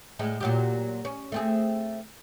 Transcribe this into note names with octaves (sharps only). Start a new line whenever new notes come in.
A2 G#3
A#2 F#3 G4
C#4
A3 C4 G#4